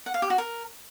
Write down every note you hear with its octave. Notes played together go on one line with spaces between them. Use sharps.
F#5
F5
G4
F#4
A#4